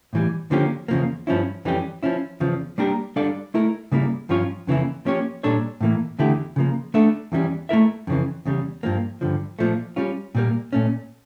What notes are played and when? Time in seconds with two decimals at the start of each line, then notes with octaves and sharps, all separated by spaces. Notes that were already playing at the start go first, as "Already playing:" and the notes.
0.13 A2 E3 G3
0.51 D3 F3 A#3 C#4 G4
0.88 E2 C#3 F3 A#3
1.27 G2 F3 C#4 E4
1.65 F2 E3 G3 C#4 G4
2.03 F3 C#4 E4
2.40 E2 C#3 F3
2.78 G3 A#3 D4 G4 A#4
3.16 G3 D4 A4 D5 F5
3.54 A3 E4 A#4
3.92 C#3 G3 A#3 E4
4.29 G2 F3 C#4 F4 C#5
4.67 F2 C#3 E3 A#3 E4
5.05 F3 A#3 C#4 G4 C#5
5.43 A#2 G3 D4 A4 C#5
5.81 A2 E3 A#3
6.19 E2 D3 A3 E4 G4
6.56 C#3 F3 A#3
6.94 A3 D4 A4 E5
7.32 E2 E3 G3 C#4
7.69 A3 E4 A#4 E5
8.07 F2 C#3 E3
8.46 E2 C#3 G3
8.83 G2 F3 A#3
9.21 G2 D3 F3
9.59 A#2 F3 A3
9.96 G3 C#4 F4
10.35 A#2 G3 A#3
10.73 A#2 A3 C#4